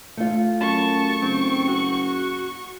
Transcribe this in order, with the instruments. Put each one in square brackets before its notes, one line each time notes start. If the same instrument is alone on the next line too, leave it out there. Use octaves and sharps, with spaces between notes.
[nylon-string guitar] A3 F4
[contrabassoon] F#2 [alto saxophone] A5 [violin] C#6
[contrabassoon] F#1 [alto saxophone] C4
[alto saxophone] F#4